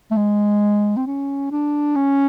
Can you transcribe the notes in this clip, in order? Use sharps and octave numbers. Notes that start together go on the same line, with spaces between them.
A3
G#3
C4
C#4
D4
C#4